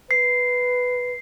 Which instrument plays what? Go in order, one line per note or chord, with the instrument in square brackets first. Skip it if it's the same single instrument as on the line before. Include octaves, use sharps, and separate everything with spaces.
[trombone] B4 [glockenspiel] C7